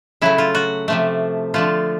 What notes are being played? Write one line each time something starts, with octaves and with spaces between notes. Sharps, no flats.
C#3 F#3 A3 E4
F4
F#4
C3 F3 A3
D3 F3 A3 F4